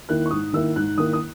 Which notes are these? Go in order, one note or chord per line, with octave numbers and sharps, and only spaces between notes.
D#3 A#3 E4 F#6
C#6
G#2 D#6
D#3 A#3 E4 E6
G#2 F#6
D#3 A#3 E4 D#6
D#6